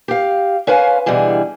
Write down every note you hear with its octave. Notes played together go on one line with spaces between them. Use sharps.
G4 F5
C#4 B4 C5 F5 G#5
B2 D3 E3 G3 G#4